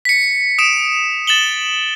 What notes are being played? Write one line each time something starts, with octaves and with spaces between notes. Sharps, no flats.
B6 C#7
D#6 D7 E7
A6 E7 F#7 G7